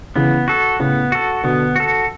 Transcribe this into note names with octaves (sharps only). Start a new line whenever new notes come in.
C#3 E3 B3
F#4 A4
A2 C#3 B3
F#4 A4
B2 D3 B3
F#4 A4